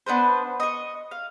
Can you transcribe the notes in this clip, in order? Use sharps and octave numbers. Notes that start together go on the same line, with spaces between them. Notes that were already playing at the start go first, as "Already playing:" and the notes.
B3 D4 B4 C5
D#5 C#6
F5